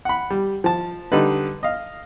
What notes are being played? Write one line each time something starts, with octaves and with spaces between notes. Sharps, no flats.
F#5 B5
G3
F3 A5
D3 G3 D#4 B4
D#5 F5